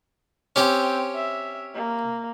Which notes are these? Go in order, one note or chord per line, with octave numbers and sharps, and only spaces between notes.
C4 C#4 G4 G5
E5
A#3